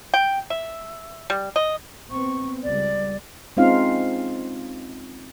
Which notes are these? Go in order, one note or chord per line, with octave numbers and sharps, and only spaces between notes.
G5
E5
G3
D#5
B3 C4 C#6
C#2 G3 D5
G#3 C4 C#4 D#4 F4 F5